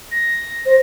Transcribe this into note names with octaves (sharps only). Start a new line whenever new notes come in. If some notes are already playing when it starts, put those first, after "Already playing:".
A#6
C5